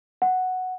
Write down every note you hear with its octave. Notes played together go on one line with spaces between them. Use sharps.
F#5